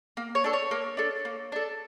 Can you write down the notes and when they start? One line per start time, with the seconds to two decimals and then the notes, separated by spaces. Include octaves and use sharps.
0.17 A#3
0.35 C#5
0.44 D4 A4
0.53 C#5
0.71 A#3
0.97 D4 A4
1.25 A#3
1.52 D4 A4